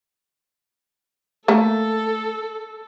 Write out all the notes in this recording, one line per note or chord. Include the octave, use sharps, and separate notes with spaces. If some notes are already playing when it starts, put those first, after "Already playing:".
A3 A#3 A4